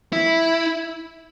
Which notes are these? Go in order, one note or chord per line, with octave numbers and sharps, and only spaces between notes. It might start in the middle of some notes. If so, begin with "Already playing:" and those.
E4